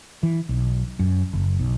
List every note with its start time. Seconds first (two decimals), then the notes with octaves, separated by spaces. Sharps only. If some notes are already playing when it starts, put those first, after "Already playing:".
0.23 E3
0.49 B1
0.99 F#2
1.33 F#1
1.59 B1